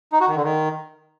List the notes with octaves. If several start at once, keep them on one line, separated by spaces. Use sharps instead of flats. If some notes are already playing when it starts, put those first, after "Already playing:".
D#4
F#4
D#3
D3
D#3